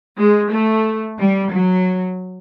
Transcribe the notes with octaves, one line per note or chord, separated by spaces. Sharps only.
G#3
A3
G3
F#3